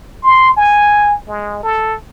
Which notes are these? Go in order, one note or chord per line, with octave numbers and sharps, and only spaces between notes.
C6
G#5
G#3
A4